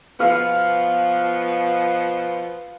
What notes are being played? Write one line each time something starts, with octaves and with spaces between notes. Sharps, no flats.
B2 F3 B3 F5